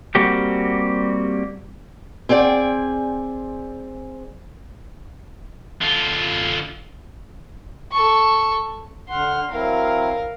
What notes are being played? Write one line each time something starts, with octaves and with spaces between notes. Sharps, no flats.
G3 A#3 C4 F#4 G4
C4 G#4 D5 G5 G#5
D3 F4
A4 C#6
D3 F#5 C6 F6
F#3 C4 E4 A#4 F5